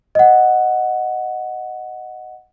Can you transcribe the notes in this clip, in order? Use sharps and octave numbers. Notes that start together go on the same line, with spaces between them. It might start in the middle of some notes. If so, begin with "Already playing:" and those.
D#5 F#5